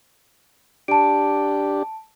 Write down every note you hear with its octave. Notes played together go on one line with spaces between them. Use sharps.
D4 G4 A5 D7